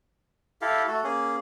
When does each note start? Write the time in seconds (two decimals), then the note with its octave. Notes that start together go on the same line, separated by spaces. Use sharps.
0.61 E4 G4 A4 F5
0.88 A3 F#4 A4
1.04 A#3 C#4 G#4